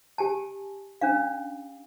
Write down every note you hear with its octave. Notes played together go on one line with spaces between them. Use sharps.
G4 G#5 A5
C#4 D4 F5